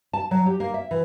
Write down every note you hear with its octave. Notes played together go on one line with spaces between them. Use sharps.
A5
F#3
G4
A#3
E5
E3